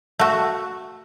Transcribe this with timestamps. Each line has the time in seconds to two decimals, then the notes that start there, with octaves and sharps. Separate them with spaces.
0.19 A3 F#4